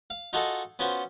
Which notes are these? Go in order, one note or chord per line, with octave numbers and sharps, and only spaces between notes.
F5
D#4 F4 F#4 G#4 A4 D#5
B3 C#4 F4 F#4 C5